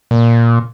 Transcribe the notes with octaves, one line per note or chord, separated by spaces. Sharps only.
A#2